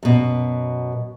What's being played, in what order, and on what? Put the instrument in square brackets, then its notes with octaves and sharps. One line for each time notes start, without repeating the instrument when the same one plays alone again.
[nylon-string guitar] F#2 B2